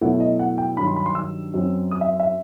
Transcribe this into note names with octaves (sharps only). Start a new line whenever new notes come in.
B2 F#3 A3 E4 F#5
D#5
F#5
G5
G2 D#3 F#3 B5
C6
B5
C6
E6
F#2 F#3 C4
D#6
E5
E5